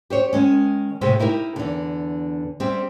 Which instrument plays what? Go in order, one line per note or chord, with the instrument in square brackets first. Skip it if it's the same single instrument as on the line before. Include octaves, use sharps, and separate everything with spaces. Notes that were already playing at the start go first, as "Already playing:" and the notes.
[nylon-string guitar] G4 C5 C#5
D#3 G#3 C#4
A2 C3 G#3 A3 G4 C5
D#4 E4 G4 A#4
E2 D3
G3 C4 G#4 E5